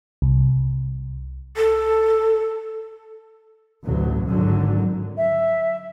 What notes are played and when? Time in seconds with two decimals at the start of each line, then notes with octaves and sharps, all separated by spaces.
0.22 C2
1.57 A4
3.85 A1 D2 F#3
4.29 G#1 F#2 D3 F#3
5.17 E5